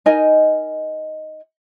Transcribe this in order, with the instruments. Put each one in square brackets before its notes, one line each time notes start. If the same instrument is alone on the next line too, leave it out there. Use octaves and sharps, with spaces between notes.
[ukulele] D#4 A#4 D#5 G#5